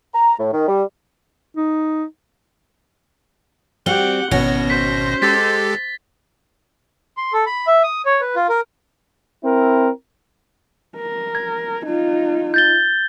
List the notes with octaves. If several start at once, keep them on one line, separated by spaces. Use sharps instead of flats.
A#5
A2
D#3
G3
D#4
G3 C4 F#4 G4 F#5 G7
G#1 B2 B3 C#4 F#4 A#6
C5 B6
G#3 G4 A4 A6 B6
C6
A4
B5
E5
D#6
C#5
B4
F4
A#4
C4 E4 A#4
A#4
G#6
D#4 F4
G6 A6 G7